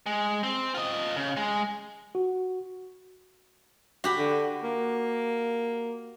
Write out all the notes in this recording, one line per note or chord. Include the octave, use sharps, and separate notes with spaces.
G#3
C4
F4 D#5
C#3
G#3
F#4
F#4 G4 B5
D3
A#3